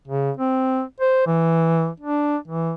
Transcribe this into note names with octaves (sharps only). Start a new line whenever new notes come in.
C#3
C4
C5
E3
D4
E3